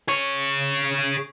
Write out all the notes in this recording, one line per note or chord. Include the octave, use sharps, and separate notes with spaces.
G#4 C#5